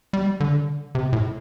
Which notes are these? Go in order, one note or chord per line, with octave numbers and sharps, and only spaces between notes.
G3
D3
C3
A2